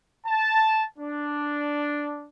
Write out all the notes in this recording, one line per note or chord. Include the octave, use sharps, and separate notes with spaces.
A5
D4